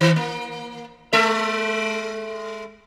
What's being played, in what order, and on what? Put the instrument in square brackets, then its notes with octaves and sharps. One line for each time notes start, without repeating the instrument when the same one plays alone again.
[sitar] D#3
A#3
G#3 A4 E5